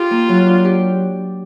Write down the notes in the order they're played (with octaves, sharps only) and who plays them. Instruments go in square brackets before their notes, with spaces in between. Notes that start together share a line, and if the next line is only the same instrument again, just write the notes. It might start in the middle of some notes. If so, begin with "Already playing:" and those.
Already playing: [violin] F4 [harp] G4
[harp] A#3
F#3
D4
G4